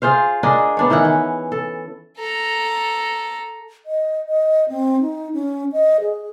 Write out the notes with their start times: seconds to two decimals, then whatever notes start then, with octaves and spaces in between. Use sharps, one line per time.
0.02 F4 G#4 C5 F5
0.43 D4 G#4 A#4 D#5
0.77 B3 D4 C#5
0.90 D#3 E3 E4 F#5
1.05 C#4
1.52 A4
2.18 A4 A#5
3.86 D#5
4.27 D#5
4.69 C4
5.01 D#4
5.33 C#4
5.72 D#5
6.01 G#4